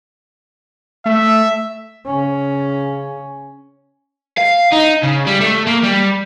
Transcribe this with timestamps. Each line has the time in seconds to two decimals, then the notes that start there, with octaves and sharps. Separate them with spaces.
1.06 A3 E5
2.06 C#3 C#4
4.38 F5
4.73 D#4
5.03 C#3
5.27 G3
5.41 A3
5.67 A#3
5.83 G3